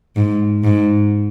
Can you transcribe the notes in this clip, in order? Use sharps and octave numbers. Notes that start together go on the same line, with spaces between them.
G#2
G#2